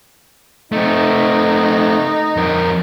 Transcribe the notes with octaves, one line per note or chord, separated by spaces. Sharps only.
A3 C4 D#4
F2 A#4